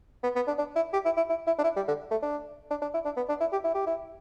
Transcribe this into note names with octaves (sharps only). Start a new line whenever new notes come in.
B3
B3
D4
D4
E4
G4
E4
E4
E4
E4
D4
E4
G3
D3
A3
D4
D4
D4
E4
D4
B3
D4
E4
G4
E4
G4
E4